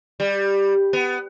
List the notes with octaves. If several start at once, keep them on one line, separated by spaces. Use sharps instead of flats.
G3
B3